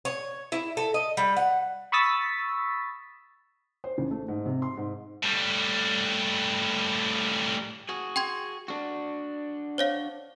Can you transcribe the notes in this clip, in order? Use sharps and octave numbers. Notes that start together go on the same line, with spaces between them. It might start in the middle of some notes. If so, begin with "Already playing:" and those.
C#5
E4
A4
D#5
G3
F#5
B5 C#6 D#6 E6 A6 B6
C5
A1
A3
G#2
C3
C6
G#2
A2 G3
F#4 G#4
G5 C6 G#6
D4 F#4
C5 C#5 F5